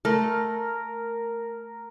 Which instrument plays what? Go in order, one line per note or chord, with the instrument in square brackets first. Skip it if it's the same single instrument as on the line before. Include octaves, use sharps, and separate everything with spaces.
[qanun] A3 [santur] A#4